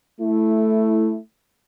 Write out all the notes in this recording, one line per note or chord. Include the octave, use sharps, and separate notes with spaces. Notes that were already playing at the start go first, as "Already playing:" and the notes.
A3 E4